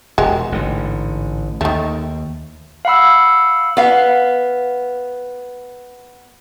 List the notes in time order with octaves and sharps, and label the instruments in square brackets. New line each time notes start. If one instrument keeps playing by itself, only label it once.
[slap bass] E1 [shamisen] G#3 F#4 G4
[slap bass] A1 G#2 D3
[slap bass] D#2 [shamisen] D#3 A3
[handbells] F5 F#5 B5 E6
[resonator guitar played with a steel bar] B3 F5